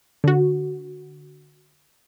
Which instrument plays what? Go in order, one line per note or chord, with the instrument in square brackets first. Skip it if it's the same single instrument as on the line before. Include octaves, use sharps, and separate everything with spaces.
[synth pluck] D3 F#4